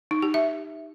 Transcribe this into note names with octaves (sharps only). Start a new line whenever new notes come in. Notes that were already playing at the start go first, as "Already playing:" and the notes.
D#4
G4
E5